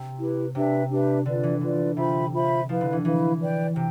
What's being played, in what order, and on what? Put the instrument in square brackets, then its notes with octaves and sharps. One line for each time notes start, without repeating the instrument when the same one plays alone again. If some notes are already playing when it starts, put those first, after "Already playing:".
Already playing: [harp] C3
[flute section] E4 G4 B4
[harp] C3 [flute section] D4 G4 B4 E5
[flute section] D4 G4 B4 E5
[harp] D3 [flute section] F4 B4 D5
[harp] E3
[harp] D3 [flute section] F4 B4 D5
[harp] C3 [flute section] F4 C5 E5 B5
[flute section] F4 C5 E5 B5
[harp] F3 [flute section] E4 B4 F5
[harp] D3
E3
[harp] E3 [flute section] E4 B4 F5
[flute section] B4 D5 G5
[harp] C3 [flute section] G5